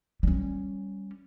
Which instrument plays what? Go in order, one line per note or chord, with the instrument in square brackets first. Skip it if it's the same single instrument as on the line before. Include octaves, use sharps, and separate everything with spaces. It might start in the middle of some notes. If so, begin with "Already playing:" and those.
[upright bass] G3 C#4